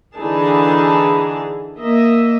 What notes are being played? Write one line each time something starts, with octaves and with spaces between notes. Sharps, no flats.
D3 E3 D#4 G#4 A5
A#3 D#5 E5